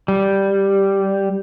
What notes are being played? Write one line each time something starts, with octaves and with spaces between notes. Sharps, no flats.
G3